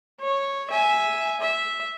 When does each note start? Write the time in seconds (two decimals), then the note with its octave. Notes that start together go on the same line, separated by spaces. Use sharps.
0.21 C#5
0.71 E5 G#5
1.41 E5